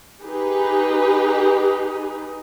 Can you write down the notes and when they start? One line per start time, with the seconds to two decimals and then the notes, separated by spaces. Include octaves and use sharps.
0.23 D#4 G4 G#4 B4